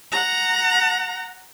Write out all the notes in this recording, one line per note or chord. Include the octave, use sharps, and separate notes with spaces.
F#5 A#5